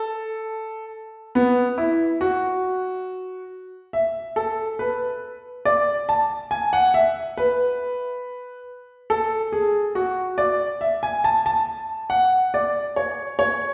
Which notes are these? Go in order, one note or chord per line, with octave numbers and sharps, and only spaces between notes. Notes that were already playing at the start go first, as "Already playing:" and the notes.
Already playing: A4
B3
E4
F#4
E5
A4
B4
D5
A5
G#5
F#5
E5
B4
A4
G#4
F#4
D5
E5
G#5
A5
A5
F#5
D5
C#5
C#5